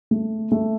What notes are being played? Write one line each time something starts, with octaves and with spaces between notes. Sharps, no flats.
A3
A3